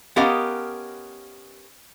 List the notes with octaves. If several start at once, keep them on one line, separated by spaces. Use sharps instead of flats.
B3 C#4 G4 A#4 D#5 F5